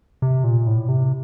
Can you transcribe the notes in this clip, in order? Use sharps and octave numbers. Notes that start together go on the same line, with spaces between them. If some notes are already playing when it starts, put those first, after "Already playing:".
C3
A#2
A2
C3